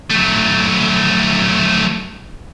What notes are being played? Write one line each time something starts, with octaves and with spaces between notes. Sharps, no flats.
F#3 A3